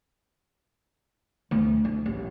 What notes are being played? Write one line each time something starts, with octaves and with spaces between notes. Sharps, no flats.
D2
D2
A1